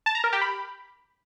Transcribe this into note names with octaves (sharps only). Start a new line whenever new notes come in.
A5
A#5
A#4
G4
B5